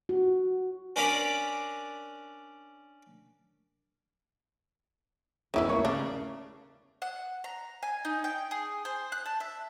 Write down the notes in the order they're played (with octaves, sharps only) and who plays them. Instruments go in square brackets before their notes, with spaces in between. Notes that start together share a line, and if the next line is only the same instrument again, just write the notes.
[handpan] F#4
[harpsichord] C#4 D4 A#4 D5 F5 B5
[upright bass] G#1 E2 [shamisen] D#3 E3 B3 [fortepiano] C#4 E4
[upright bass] A3 [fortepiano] A#3 C#5
[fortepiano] C#3 [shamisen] D4
[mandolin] F#5
A#5
G#5
D#4
G5
G#4
C5
F#6
A5
E5